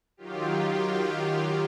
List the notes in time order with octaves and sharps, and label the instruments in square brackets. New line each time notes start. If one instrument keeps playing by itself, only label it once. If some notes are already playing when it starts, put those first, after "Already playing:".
[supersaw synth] D#3 F#3 F4 G4